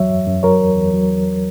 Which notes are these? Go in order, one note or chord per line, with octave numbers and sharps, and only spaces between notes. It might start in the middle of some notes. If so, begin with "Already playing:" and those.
Already playing: E2 F#3 C#5 E5
F#2
F#2
F#3 A#4 C#5
E2
E2
F#3
E2